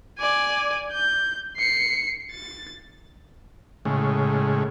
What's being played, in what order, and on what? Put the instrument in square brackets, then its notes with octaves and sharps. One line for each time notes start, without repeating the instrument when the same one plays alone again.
[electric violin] D5 G#5
G6
C7 C#7
A6
[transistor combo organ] A2 C#3 G#3